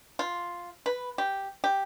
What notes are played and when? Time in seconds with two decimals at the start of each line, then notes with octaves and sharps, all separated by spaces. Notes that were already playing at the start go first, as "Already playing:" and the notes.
0.19 F4
0.86 B4
1.18 G4
1.64 G4